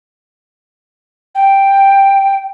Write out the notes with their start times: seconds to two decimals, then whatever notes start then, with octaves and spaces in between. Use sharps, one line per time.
1.35 G5